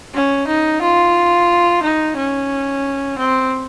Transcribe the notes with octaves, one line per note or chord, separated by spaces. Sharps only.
C#4
D#4
F4
D#4
C#4
C4